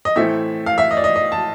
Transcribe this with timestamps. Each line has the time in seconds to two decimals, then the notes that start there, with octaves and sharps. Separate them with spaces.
0.05 D#5
0.16 A2 E3 A3 C4 E5
0.66 F5
0.78 E5
0.91 D#5
0.97 D5
1.04 D#5
1.16 D#5
1.32 A5